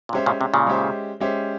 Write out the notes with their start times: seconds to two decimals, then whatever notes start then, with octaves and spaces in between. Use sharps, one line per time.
0.09 A#2
0.13 C3 G#3 C#4 G4 C5 E5
0.26 A#2 C#3
0.41 C3
0.54 A#2 C#3
0.67 G#3 C#4 G4 C5 E5
1.20 G#3 C#4 G4 C5 E5